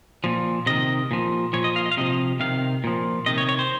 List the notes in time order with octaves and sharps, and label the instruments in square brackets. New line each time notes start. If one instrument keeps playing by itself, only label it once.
[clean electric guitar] A#2 F3
C3 D#3 D#5
A#2 F3
A#2 F3 C#5
D#5
F5
D#5
F5
C3 F3 D#5
C3 D#3 F5
A#2 F3
C3 D#3 D#5
C#5
C#5
C5